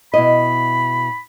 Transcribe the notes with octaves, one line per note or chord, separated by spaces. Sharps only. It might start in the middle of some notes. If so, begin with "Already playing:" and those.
B2 E4 D#5 B5